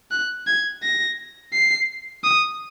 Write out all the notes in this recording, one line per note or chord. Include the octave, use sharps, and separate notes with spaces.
F#6
G#6
A#6
C7
D#6